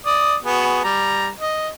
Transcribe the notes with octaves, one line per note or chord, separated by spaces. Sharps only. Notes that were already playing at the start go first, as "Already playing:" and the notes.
D5 D#6
B3 F#4 G#4
G3 A#5
D#5